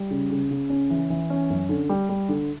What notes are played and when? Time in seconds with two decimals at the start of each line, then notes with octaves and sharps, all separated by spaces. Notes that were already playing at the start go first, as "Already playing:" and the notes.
Already playing: G3
0.11 C#3
0.31 C#3
0.51 C#3
0.70 C#4
0.90 E3
1.10 E3
1.30 C#4
1.50 F#2
1.69 D3
1.89 G3
2.09 G3
2.29 D3